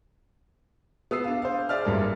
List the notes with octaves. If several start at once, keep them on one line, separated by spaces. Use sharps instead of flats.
B3 D#6 E6 C7
D4 F5
C5 F5
G#4 D5 E5 F6
F#1 G2 A#4